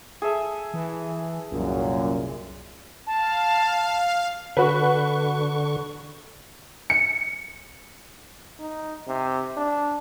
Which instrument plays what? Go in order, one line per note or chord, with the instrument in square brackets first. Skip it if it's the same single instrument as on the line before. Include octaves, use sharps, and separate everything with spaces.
[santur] G#4 A4 E5
[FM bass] E3
[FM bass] C2 [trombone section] F#2 A#2
[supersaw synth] F5 [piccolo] A5
[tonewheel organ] D3 C#6 [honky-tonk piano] F#4 B4
[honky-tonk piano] C#7
[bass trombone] D#4
C3
D4